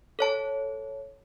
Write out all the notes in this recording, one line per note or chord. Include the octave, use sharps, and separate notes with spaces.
A4 C#5 A5